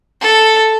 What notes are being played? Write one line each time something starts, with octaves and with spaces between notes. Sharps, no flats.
A4